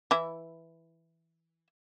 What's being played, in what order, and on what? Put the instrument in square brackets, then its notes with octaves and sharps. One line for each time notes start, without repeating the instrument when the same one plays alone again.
[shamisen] E3 E4